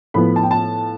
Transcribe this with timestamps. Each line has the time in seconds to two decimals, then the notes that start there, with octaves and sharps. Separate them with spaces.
0.14 A2 F3 B3 B5
0.36 A5
0.43 G5
0.51 A5